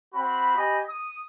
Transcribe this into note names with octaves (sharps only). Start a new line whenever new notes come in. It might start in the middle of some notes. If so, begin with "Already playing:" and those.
C4 F#4 B5
G4 D#5 G#5 B5 D#6
D#6